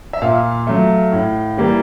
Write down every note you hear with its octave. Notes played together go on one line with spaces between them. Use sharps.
E5
A#2 F5
F#3 A3
A2
E3 G3 A#3